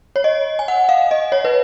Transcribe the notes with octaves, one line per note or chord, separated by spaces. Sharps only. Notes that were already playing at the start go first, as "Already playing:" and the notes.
C#5
D#5
G#5
F#5
F5
D#5
C#5
B4